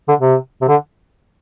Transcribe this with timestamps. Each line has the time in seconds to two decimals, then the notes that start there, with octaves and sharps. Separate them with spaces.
0.08 D3
0.20 C3
0.61 C3
0.68 D3